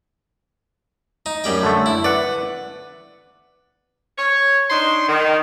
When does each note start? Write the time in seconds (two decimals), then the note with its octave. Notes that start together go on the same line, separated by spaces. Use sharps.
1.26 D#4
1.44 F#2 G3 G5
1.63 D3 A3
1.86 E4
2.04 B4 D5 F#5
4.18 C#5
4.70 D4 D#4 C6
5.09 D#3